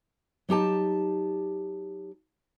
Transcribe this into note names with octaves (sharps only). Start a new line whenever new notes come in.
F#3 D#4 G4 A5